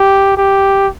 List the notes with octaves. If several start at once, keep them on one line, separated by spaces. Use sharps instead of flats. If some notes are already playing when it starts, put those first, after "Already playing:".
Already playing: G4
G4